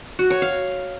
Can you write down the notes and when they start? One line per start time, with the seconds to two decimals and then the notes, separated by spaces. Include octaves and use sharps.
0.19 F#4
0.30 C#5
0.42 F5